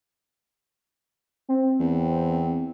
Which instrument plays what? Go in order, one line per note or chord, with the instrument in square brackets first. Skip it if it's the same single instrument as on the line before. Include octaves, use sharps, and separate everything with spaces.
[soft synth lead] C4
[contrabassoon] E2